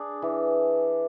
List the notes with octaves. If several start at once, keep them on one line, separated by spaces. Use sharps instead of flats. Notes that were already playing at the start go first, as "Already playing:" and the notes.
Already playing: D4 G#4
E3